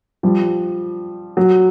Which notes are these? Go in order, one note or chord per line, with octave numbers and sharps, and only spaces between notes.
F3 G3
F#3